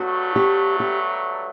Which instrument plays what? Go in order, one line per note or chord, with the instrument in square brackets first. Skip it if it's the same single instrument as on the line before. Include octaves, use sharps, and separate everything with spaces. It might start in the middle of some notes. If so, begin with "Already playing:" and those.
Already playing: [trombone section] G2 F#3 A3 [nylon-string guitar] F#4
[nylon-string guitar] G4
G4